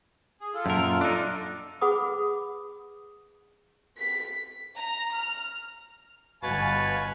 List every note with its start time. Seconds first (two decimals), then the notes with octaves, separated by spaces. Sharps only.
0.41 G#4
0.54 F4 A4
0.66 F#2 A#2 A#4
1.01 D4 D#4
1.81 G#4 B4 F#5 B5 D6 D#6
3.97 B6
4.77 A#5
5.14 F6
6.43 G1 B2 B4 C#5 F5 G#5 A6